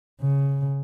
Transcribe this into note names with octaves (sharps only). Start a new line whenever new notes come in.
C#3